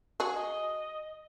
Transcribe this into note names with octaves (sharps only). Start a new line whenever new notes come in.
F#4 G#4 C#6
D#5